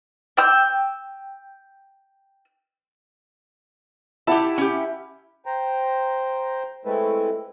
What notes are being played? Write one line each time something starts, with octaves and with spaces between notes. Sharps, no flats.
G5 E6
E4 G4 F#5 A5
C#4 G4
C5 G5 A#5
G#3 A3 C4 E4 A4 B4